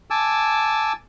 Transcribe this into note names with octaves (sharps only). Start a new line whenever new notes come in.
G#5 A5 D6 E6